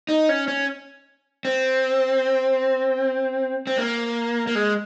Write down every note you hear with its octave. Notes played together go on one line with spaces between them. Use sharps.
D#4
C#4
C#4
C4
C4
A#3
A#3
G#3